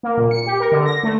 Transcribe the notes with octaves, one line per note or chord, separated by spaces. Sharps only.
A#3
A#2
C#7
G4
A#4
D3
A#6
A3